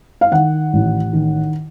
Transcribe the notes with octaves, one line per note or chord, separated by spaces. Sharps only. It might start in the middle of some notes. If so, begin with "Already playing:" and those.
F5
D#3 F#5
A1
D#3